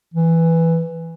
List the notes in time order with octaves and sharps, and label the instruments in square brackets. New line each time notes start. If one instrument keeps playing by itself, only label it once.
[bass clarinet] E3